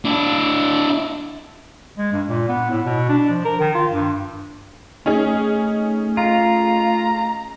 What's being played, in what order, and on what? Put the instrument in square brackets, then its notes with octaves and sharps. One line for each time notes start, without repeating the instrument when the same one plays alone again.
[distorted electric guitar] D4 E4
[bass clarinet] G#3
G2
A#2
B3
A2
B2
D4
F3
A#4
D#3
F4
G2
[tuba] A3 [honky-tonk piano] C#4 D#4 G#4
[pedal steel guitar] F4 [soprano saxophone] A#5